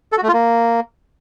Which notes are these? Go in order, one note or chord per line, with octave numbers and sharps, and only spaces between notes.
A4
F#4
A3
F4
A#3